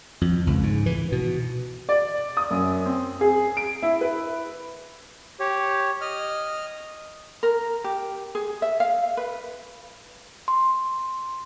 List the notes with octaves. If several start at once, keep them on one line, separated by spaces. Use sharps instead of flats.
F2
C#2
G#2
E3
B2
D5
D#6
F#2
C4
G#4
D7
E4
B4
G4 C#5
D#5 F6
A#4
G4
G#4
E5
F5
B4
C6